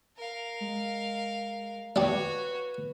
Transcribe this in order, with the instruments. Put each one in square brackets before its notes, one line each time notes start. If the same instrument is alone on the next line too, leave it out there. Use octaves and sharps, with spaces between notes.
[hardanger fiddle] A#4 F5
[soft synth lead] G#3
[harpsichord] D4 G4 [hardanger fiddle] F#4 C#5 [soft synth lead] B4